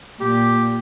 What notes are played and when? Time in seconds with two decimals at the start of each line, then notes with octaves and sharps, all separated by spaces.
0.21 A#2 G4